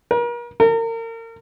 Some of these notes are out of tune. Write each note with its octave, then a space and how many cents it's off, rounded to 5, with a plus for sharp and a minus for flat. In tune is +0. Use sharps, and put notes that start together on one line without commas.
A#4 +40
A#4 -35